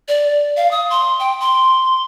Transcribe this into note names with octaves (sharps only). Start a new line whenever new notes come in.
D5
F5
D#6
C6
G5
C6